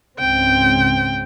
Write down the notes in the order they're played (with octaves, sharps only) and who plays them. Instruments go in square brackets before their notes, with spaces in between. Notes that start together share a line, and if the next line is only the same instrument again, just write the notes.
[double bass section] C#2 G#2 C4 [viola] G5